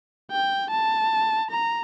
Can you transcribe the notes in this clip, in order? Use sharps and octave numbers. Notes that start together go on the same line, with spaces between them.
G5
A5
A#5